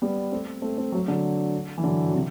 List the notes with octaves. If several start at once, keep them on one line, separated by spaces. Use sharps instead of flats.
G3 B3
A3 C4
A3 C4
A3 C4
F#3 A3
D3 F#3
E3
D3 F#3
F#3
C3 E3